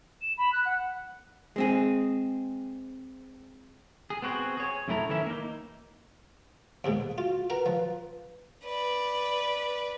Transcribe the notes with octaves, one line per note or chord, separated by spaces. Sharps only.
E7
B5
F#6
F#5
G#3 C4 G#4
G#4
B3 C4 F#4 G#4 C5
G#4 C#5
F#2 A2 A3 E4 A4 A#5
D#3 E3 C#4 E4 E5
A#3 D#4
D#2 G#2 B2
F4 F#4
A#4 B4 F#5 A#5
F3
B4 D5